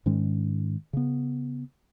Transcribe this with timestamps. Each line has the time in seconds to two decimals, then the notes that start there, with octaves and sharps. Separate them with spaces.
0.06 G#2 D#3 G#3 C#4
0.93 C#3 B3